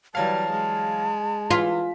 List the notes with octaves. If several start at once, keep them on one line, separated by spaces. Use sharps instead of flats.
E3 F#3 G3 F5 A5
G#3
E3 F4 B6